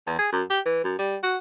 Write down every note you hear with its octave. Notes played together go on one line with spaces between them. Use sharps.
E2
G#4
F#2
G4
E3
F#2
G3
F#4